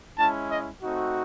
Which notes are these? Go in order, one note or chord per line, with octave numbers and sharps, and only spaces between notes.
G#3 C#4 E4 A5
D#5
A3 C4 D#4 F#4